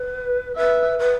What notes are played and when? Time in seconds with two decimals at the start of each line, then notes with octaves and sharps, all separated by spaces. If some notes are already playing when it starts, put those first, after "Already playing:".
Already playing: B4
0.56 B4 E5
0.99 B4